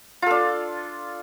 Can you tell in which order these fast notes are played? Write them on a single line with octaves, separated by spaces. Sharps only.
F4 A4 D4